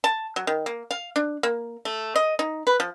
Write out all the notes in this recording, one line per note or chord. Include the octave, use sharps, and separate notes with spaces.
A5
F#3
D#3
A#3
F5
D4
A#3
A3
D#5
D#4
B4
F3